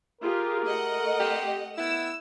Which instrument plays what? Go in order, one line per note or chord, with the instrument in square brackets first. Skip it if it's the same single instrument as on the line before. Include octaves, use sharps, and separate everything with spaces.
[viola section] F4 G4 G#4 [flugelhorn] A#4
[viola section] A3 [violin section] D#5 F#5
[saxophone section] C4 G4
[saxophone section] B3 E4 [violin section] E6